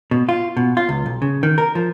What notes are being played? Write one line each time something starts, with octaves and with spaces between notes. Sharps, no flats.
B2
F4
B2
F4
C#2
B1
C#3
D#3
A#4
F3